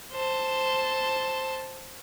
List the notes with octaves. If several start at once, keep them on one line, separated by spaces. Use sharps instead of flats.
C5 A5